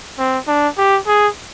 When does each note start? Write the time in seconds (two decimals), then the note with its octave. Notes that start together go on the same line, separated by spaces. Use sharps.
0.18 C4
0.48 D4
0.77 G4
1.07 G#4